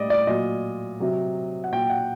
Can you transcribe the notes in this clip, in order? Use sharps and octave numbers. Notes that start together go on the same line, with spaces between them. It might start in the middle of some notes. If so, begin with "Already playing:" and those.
Already playing: A2 G3 D5 D#5
D5
A#2 F#3 D#5
C3 F#3
F#5
A#2 F#3 G5
F#5